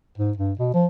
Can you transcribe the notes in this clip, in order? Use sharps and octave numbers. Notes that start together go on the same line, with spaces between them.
G#2
G2
B2
F3